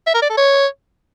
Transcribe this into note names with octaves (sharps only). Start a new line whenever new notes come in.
E5
A#4
D5
A4
C#5